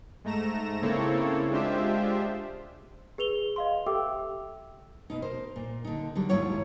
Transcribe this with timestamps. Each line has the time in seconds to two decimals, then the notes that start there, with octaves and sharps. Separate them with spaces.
0.24 G#2 A3 A#5 A#6 E7
0.82 C#3 A#3 C4 E4 A4 C#5
1.51 G#3 D4 F4 G4 C5 E5
3.18 G#4 B4 F7 G7
3.56 D#5 F5 C6
3.86 G4 A4 E5 G5 D6 E6
5.10 B2 D#4
5.22 A#4 C5
5.56 A#2
5.85 D3 D#4
6.15 D3 F#3 G3
6.29 D#2 G#2 E4 F4 C#5 F#5